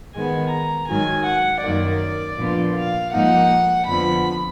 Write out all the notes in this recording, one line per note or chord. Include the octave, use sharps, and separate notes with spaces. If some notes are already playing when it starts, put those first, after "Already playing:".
G#2 D#3 G#3 B3 G#5
A#5
G#2 D#3 F#3 G#5
F#5
F#2 D#3 A#3 D5
A#2 F3 B3 D4 F4
F5
G#2 F3 A#3 D#4 F#5
F2 D3 F3 B3 B5